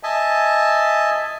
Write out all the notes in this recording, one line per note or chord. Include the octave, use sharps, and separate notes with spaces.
D#5 E5 G#5 A5